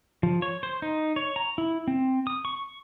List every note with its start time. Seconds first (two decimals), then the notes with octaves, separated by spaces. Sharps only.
0.23 F3
0.42 C#5
0.63 C5
0.82 D#4
1.16 C#5
1.36 A#5
1.58 E4
1.88 C4
2.27 D#6
2.45 C#6